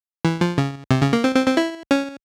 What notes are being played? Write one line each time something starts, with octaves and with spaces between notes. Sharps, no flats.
E3
F3
C#3
C3
C#3
A#3
C4
C4
C4
E4
C#4